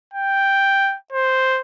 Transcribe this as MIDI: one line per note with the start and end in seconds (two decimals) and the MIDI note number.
0.14 0.96 79
1.12 1.61 72